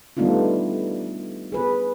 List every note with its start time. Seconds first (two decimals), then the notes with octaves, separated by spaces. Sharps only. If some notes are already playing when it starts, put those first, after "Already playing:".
0.17 G3 A3 B3 D4 D#4 F4
1.52 G#4 B4